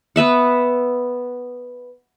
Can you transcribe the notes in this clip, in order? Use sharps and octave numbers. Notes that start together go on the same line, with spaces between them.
B3 B4 E5 F#5